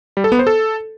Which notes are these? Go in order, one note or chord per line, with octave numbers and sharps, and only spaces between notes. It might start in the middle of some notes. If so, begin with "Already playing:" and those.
G3
A4
B3
C5
A4